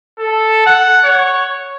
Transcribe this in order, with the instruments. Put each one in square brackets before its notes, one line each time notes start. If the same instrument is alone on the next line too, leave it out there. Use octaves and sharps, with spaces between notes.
[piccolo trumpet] A4
F#5
C#5